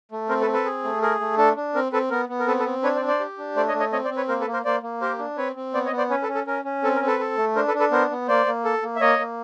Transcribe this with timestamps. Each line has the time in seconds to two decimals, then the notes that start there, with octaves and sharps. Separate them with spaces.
0.12 A3
0.29 C4 A#4 C5
0.41 A4 B4
0.47 C4
0.53 A4 B4
0.65 G#4
0.84 A3
1.02 G#4 A#4
1.20 A3
1.38 D4 A4
1.56 D4
1.74 C4 A#4
1.92 C4 A4 B4
2.10 B3 A#4
2.29 B3
2.40 A#4
2.47 C4 A4 B4
2.59 A4 B4
2.65 C4
2.83 D4 B4 C#5
2.96 C5 D5
3.01 D4
3.08 C5 D5
3.20 G4
3.38 D4
3.56 A3 C5 D5
3.68 C#5 D#5
3.74 A3
3.80 C#5 D#5
3.92 C4 C#5 D#5
4.05 C5 D5
4.10 C4
4.17 B4 C#5
4.28 A#3 A#4 C5
4.41 A4 B4
4.47 A#3
4.53 A#4 C5
4.65 A#3 C5 D5
4.83 A#3
5.01 G4 A#4 C5
5.19 D4
5.37 C4 B4 C#5
5.56 C4
5.74 B3 C5 D5
5.85 C#5 D#5
5.92 B3
5.98 C5 D5
6.10 C#4 B4 C#5
6.22 A4 B4
6.28 C#4
6.35 A4
6.47 C#4 A#4
6.65 C#4
6.83 C4 A4
6.95 A#4
7.01 C4
7.07 A4 B4
7.20 A4
7.37 A3
7.56 D4 A#4 C5
7.67 A4 B4
7.74 D4
7.79 A4 B4
7.91 B3 A#4 C5
8.10 B3
8.28 A#3 C5 D5
8.46 A#3
8.65 A4
8.83 A#3
8.96 E5
9.00 A#3 C#5 D#5
9.19 A#3